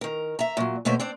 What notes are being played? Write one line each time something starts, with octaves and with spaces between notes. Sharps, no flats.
D#3 A#4
E5 A#5
A#2 F#3
D#2 B2 A3 C5 C#5
C4 D4 D5